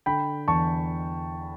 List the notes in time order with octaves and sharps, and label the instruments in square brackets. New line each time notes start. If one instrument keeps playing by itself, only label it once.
[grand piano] D3 G5 B5
E2 A5 C#6